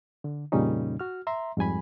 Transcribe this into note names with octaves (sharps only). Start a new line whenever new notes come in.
D3
F2 A#2 C#3 G3 C#4 D#4
F#4 F6
E5 A#5 C6
F2 G#2 G3 G#5 B5